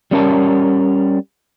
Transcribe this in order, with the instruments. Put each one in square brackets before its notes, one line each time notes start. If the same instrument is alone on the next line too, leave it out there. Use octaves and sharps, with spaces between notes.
[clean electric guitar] G3 C#4 A#4 A5